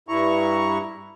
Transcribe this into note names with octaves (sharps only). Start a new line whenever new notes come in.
G2 E4 A#5 C#6